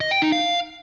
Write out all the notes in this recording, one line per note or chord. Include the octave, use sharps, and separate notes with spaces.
D#5
G5
D#4
F5